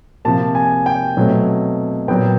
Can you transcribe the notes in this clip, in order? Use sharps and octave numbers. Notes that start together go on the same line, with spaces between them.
C3 F3 A#3 A5
G#5
G5
B2 F#3 A3 C4
A#2 F#3 B3 G5